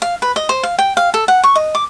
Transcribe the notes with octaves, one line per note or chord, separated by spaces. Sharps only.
F5
B4
D#5
C5
F5
G5
F5
A4
F#5
C#6
D#5
D6